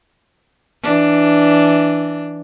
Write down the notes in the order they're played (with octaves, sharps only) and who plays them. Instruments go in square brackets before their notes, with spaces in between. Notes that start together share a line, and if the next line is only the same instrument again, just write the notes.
[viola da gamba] E3 D4